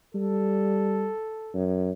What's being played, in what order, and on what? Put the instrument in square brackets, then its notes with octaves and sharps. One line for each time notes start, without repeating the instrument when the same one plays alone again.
[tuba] G3 [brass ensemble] A4
[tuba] F#2